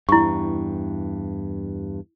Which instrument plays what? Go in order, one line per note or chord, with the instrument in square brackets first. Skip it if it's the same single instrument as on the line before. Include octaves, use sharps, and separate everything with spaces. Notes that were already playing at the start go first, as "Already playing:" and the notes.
[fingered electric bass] E2 G2 [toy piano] E4 C#6